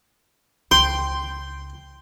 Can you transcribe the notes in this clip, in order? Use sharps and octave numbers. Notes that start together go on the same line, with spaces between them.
C#2 G5 C6